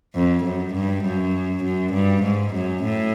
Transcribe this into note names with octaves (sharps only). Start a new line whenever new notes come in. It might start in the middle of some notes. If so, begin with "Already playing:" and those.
F2
F#2
G2
F#2
F#2
G2
G#2
F#2
A2